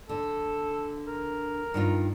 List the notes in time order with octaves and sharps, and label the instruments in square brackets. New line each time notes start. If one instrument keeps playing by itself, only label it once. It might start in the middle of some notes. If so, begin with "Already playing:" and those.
[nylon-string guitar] D3 [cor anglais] A4
[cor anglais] A#4
[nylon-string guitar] G2 D#3 F4